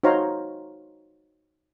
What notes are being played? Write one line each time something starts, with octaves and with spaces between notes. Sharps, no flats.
D#4 F#4 C5 C#5 F5 A#5